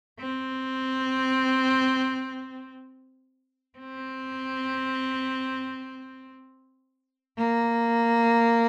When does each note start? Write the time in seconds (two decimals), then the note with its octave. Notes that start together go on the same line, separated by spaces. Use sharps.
0.19 C4
3.79 C4
7.38 A#3